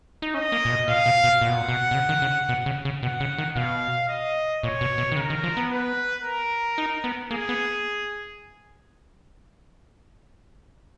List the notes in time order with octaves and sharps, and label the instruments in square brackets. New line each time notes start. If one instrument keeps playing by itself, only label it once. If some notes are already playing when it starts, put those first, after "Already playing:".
[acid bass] D#4
[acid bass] C#4 [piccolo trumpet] D#5
[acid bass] A#3
A#2
B2
[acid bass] A#2 [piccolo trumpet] F5
[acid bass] B2
B2
[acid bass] A#2 [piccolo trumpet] F#5
[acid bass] B2
A#2
B2
B2
C#3
D#3
C#3
B2
C#3
C#3
[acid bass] B2 [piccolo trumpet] F#5
[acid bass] C#3
D#3
[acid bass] B2 [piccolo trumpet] F5
[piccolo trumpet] D#5
[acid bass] A#2 [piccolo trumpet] C#5
[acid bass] B2
B2
D#3
[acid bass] C#3 [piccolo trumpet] A#4
[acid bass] D#3
F3
B3
[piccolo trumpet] B4
A#4
[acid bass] D#4
B3
[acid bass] A#3 [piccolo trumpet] G#4
[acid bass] B3